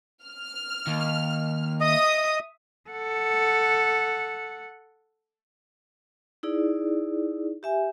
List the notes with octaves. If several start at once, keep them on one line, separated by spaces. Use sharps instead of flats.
F6
D#2
D#5 E5 D#6
A4 F#5
D#4 E4 G#4 D5
G4 E5 G#5